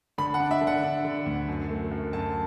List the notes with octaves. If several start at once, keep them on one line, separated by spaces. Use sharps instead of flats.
D3 B5
F#5
D4
E5
D3
F#5
D4
D3
D2
F#2
A3
F#2
F#2 A5